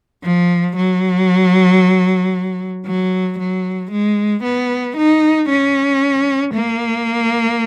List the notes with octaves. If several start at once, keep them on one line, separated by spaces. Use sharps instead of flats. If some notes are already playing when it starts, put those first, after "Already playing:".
F3
F#3
F#3
F#3
G#3
B3
D#4
C#4
A#3